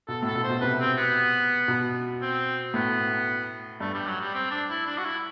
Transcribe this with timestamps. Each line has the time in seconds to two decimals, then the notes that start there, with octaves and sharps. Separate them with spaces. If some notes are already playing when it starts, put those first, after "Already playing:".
0.08 B2 A4
0.23 A2 A4
0.35 B2
0.44 C5
0.49 B2
0.61 C3 B4
0.80 C4
0.98 B3
1.68 B2
2.22 C4
2.74 A2 B3
3.80 G2 A3
3.94 G3
4.07 F#3
4.21 G3
4.34 C4
4.51 D4
4.70 E4
4.86 D4
4.98 F#4
5.05 E4